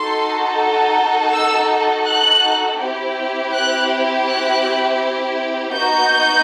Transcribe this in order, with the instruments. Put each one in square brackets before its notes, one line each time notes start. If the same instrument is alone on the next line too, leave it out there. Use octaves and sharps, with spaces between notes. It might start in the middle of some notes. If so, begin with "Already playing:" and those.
Already playing: [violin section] D#4 F#4 A4 C6
E6
F#6
C4 E4 G4
F#6
F#6
B3 D#4 F#4 G6